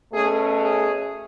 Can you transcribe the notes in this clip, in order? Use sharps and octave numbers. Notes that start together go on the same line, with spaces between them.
B2 A3 C#4 G#4
G#4